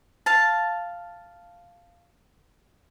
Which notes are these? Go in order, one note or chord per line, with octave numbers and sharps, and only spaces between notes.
F5 A5